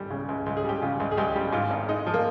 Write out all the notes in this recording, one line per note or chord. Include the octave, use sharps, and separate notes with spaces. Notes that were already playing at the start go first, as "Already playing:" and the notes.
Already playing: C#2 G3
C#3
C#2
C#2
G#4
G3 G4
C#3 F4
C#2
G#4
C#2 G4
G3
G#2 F4
G#1
G#3 D#4
F3
A#3